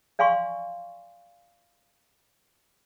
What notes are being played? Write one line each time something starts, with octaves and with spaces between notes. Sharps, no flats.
D5 F5 G#5 C6 C#6